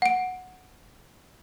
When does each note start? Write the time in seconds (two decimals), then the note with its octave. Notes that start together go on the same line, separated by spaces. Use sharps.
0.02 F#5 D7